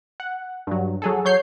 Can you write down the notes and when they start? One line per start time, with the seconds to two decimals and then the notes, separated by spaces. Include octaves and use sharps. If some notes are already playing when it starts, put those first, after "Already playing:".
0.20 F#5
0.67 G2 F#3
1.02 F#3 G#4 A4
1.25 F#3 C#5 G6 C7